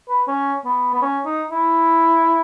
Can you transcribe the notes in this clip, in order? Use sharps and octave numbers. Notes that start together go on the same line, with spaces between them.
B4
C#4
B3
B3
C#4
D#4
E4